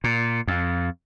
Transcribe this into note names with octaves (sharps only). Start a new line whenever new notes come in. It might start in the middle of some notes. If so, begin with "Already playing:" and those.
A#2
F2